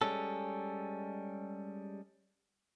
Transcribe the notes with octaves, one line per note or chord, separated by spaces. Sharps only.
G3 G#3 C#4 A4